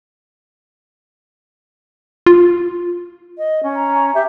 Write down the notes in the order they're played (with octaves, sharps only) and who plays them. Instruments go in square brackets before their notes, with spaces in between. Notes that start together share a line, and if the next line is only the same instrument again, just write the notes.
[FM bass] F4
[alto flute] D#5
C#4
[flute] A#5
[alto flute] G4 [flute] E5